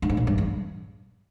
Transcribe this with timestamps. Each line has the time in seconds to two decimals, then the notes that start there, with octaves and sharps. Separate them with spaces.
0.02 G2
0.10 G#2
0.17 A#2
0.27 G2
0.38 E2